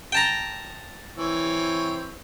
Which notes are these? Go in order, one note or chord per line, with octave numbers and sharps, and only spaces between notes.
G5 A5 A#5
E3 C4 C#5